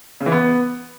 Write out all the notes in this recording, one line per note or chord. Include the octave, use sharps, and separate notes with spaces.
C#3
E3
B3